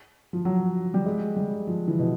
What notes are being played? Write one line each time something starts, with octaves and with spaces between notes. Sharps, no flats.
F3
F#3
G3
G#3
G3
F3
E3
B2